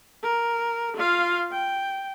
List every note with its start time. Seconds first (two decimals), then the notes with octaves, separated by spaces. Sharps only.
0.24 A#4
0.97 F4 F5
1.52 G5